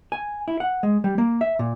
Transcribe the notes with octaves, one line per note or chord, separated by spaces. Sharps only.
G#5
E4
F#5
G#3
G3
A#3
E5
A#2